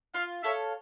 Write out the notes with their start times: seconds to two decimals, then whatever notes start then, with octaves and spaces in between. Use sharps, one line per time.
0.14 F4 F5
0.43 A4 C#5 E5 F5